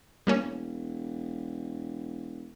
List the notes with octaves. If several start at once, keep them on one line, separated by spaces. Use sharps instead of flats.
E1 G3 A#3 C#4